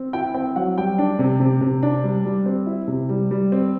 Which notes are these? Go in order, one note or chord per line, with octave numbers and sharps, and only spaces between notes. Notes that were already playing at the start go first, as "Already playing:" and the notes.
Already playing: C4
E4 G5
C4 G5
F#3 F#5
G3 G5
D4
C3
C3
C3
D4
G3
G3
C4
E4
C3
G3
G3
C4